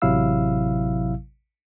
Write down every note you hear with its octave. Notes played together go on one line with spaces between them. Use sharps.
A1 C3 F#3 E4 F5 E6